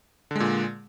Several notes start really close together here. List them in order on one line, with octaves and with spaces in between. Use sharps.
D3 G#3 A#2